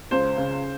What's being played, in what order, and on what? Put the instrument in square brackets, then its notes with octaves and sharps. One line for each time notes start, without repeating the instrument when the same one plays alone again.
[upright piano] C#2 [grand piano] C5
[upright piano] C#3